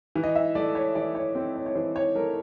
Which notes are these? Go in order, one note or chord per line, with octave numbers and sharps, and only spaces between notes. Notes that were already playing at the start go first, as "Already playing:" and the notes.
E3
D#5
E5
A3 D5
C#5
E3 D5
C#5
C4 C5
C#5
C#5
E3 C5
C#5
A3 A#4